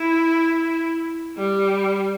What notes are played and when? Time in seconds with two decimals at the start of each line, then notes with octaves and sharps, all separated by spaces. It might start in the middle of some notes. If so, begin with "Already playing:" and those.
Already playing: E4
1.37 G3